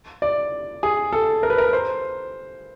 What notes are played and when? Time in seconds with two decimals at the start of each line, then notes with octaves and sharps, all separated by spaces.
0.22 D5
0.83 G#4
1.13 A4
1.43 A#4
1.50 B4
1.58 A#4
1.73 C5